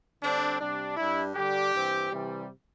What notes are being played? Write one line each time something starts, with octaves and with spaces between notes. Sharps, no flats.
D3 G3 C4 D4
C3 G3 D4
G2 G3 D4 E4
D3 G3 D4 G4
G2 E3 C4
C3 E3 G3